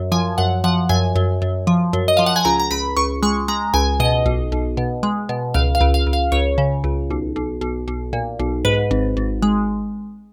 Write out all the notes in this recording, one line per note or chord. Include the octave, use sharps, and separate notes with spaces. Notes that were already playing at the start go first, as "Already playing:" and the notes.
Already playing: F#2
F3 G#5
F#2 F#5
F3 F#5
F#2 G#5
F#2
F#2
F3
F#2
D#5
F3 F5
F#5
G#5
C#2 A#5
A#5
C#2 B5
C#2 C#6
G#3 C#6
G#3 A#5
C#2 G#5
B2 D#5
B1
B1
B2
G#3
B2
C#2 F5
F5
C#2
F5
C#2
F5
C#2 C#5
C#3
C#2
B1
B1
B1
B1
A#2
B1
G#2 B4
G#1
G#1
G#3